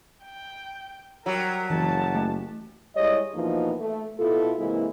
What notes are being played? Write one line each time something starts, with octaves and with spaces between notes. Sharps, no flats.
G5
F#3 G3 A#4
F#1 E3 A5
A3
G3 G#3 E4 C#5 D#5
E2 B2 E3 F3 A#3 D#4
A3
B2 E4 F4 A4
C3 E3 G#3 A#3 E4